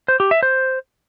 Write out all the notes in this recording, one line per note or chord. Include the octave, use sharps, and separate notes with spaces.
C5
G4
E5
C5